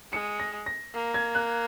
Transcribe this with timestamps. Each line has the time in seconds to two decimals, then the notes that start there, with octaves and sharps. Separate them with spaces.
0.13 G#3 C#7
0.40 A#6
0.66 A#6
0.94 A#3
1.14 G#6
1.35 F#6